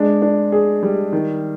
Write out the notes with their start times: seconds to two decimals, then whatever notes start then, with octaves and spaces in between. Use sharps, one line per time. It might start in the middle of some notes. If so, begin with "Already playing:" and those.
Already playing: G#3 D4
0.22 D4
0.52 G#4
0.83 G3
1.13 D#3